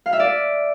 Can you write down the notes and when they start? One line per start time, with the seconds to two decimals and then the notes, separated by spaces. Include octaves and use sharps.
0.06 F5
0.13 E5
0.19 D5